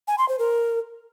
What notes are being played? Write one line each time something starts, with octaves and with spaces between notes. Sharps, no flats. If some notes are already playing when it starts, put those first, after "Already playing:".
G#5
C6
C5
A#4